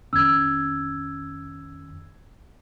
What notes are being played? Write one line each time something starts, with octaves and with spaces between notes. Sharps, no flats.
F2 D#3 C#4 E6 G#6